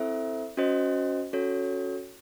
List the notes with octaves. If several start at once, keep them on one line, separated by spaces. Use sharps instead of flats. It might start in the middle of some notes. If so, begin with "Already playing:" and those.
Already playing: C4 E4 A4 C5 E5
C#4 F#4 C5 D#5
C#4 F#4 A4 C#5